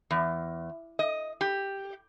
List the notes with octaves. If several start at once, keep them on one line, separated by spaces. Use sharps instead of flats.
E2
D#5
G4